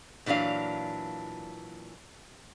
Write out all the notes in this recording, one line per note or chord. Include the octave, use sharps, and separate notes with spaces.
A#2 E3 F#3 D4 F5